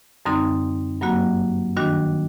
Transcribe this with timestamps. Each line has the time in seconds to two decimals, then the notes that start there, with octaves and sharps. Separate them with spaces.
0.26 F#2 D3 G3 C4 D#4
1.01 G2 F#3 A#3 F#4
1.77 D#3 G3 D4 F#4